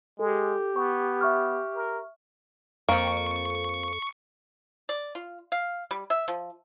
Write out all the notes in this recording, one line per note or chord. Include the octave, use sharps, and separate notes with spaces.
G#3 G4 A4
B3 C#6
E5 C#6 F6
A#4
F2 F3 A#3 C#6
D5
F4
F5
G3
E5
F3